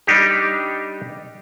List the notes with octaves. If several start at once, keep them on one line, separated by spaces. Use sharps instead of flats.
G3 D4 D#4 G4